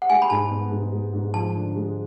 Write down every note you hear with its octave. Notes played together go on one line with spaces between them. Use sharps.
F#5
G#3 G#5
B5
G#2 A5
B3
G#2
G#3
G#2
F3 A5
D3
G#3